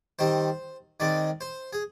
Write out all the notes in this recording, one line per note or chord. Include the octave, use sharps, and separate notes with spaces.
D#3 G3 C4 C5
D#3 G#3 C4 D5
C5
G#4